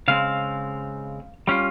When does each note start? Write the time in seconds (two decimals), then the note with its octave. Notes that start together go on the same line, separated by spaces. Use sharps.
0.08 C#3 G#3 C4 F5
1.47 G3 C#4 F4